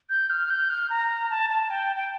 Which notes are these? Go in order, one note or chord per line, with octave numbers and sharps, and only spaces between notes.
G6
F6
G6
F6
A#5
A5
A5
G5
G5